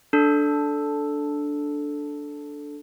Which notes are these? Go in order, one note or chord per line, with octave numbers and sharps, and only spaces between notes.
D4 A4